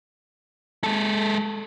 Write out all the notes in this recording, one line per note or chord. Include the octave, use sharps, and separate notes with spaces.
G#3 A4